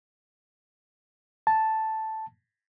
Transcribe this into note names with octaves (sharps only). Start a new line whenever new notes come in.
A5